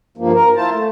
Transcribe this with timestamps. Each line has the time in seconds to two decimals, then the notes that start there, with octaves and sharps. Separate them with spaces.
0.17 G2 F3 A#3
0.34 A#4
0.56 E4 F4 C5 A5
0.71 A3